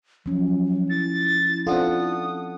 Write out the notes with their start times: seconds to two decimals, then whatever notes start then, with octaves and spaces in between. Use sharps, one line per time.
0.26 F3 F#3 C#4
0.89 E4 A6
1.67 C4 D4 F4 A4 F#5 D#6